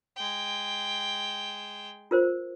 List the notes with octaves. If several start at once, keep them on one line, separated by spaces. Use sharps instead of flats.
G#3 G5
F4 A#4 C5